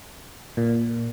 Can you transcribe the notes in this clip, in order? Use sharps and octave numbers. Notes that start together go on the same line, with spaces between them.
A#2